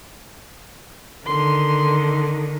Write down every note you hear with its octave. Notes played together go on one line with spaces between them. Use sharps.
D3 D#3 C6